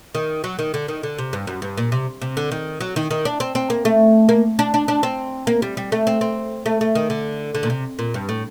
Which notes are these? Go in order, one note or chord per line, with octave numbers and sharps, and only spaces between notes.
D#3
F#3
D#3
D3
D#3
D3
C3
G2
F#2
G2
A#2
C3
C3
D3
D#3
F#3
D#3
D#3
D4
C4
C4
A#3
A3
A#3
D4
D4
D4
C4
A#3
G3
G3
A3
C4
C4
A3
A3
D#3
D3
D3
A#2
C3
A#2
G2
A2